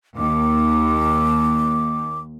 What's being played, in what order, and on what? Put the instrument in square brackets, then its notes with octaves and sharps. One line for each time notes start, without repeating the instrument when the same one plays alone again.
[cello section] D#2 [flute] D6